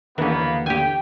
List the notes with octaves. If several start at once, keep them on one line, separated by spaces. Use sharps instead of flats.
D#2 D3 E3 A#3 B3 C#4
G4 G5 G#5